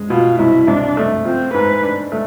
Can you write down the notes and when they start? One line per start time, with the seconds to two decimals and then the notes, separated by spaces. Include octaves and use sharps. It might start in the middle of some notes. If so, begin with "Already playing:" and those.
Already playing: G#3
0.10 B2 F4
0.39 C2 E4
0.67 C2 D4
0.97 A3
1.25 F3 C4
1.54 G#2 B4
1.83 D4
2.12 A3